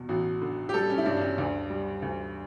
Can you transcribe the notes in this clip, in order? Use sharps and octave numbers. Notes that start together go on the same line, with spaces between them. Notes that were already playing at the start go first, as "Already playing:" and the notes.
Already playing: E2 B2
A1 F#4
D3
G4
G3 A4
C#4
E4
G2 D4
D4
C#4
D2 D4
G3
D2